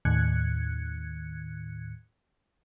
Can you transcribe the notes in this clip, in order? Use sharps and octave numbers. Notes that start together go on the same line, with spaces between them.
D#2 A2 D#3 F#6 G#6 C#7